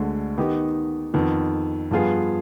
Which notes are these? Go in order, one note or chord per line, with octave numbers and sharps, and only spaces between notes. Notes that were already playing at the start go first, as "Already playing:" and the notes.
Already playing: D2 D3 G#3
D#3 B3 D#4 G4
F2 D#3 B3
G2 F3 B3 F4 G#4